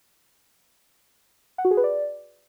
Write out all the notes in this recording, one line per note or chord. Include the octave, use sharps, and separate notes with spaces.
F#5
F#4
G#4
B4
D5